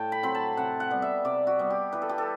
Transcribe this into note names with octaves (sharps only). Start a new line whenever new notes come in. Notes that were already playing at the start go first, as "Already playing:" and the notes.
Already playing: A2 G5 A5
B5
F#3 C4 B5
A5
C3 F#5
F#5
G3 B3
E5
C3 D5
F#4
G3 B3
G4
E3 B4
A4
G4
A4